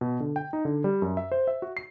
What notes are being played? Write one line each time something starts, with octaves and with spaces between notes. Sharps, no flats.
B2
D3
G5
D#4
D3
G3
F#2
E5
C5
E5
F#4
C7